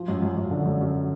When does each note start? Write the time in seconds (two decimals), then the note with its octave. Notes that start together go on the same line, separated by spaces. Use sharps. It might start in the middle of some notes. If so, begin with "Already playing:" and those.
Already playing: F3
0.08 F#2
0.22 F#2
0.37 F#2
0.51 D3
0.66 F#2
0.81 F#2